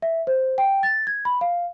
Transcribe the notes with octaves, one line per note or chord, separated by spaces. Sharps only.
E5
C5
G5
A6
G#6
B5
F5